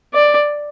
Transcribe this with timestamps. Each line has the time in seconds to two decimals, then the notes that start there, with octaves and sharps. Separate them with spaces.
0.14 D5